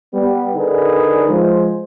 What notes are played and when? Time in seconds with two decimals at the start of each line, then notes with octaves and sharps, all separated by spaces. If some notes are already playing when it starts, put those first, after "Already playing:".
0.13 G3 B3
0.55 D3 D4 D#4 G#4 A#4 B4
1.27 F3 G#3 C5